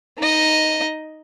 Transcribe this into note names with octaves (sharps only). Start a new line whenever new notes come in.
D#4 D#5